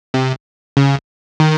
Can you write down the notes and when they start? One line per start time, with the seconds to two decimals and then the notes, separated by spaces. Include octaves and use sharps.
0.14 C3
0.77 C#3
1.40 D#3